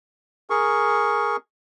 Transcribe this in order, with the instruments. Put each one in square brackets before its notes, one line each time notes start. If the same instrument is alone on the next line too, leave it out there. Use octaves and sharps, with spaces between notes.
[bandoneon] G#4 A#4 C#6